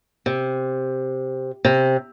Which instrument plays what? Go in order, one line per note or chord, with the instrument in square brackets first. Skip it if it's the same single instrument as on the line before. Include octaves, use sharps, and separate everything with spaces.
[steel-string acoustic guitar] C3
C3